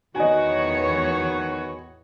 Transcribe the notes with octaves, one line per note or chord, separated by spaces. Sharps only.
E2 D#3 E3 B3 F#4 C#5 D#5 G#5